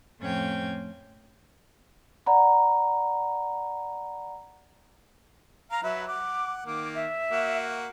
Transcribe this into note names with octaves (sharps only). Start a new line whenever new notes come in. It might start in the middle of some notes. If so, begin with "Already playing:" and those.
F2 A2 C4 C#4 G5 G#6
D5 F#5 A#5 B5
F5 A#5
F#3 B4 E5
F#5 D6
D#3 A#3 D6
E5
A#3 F#4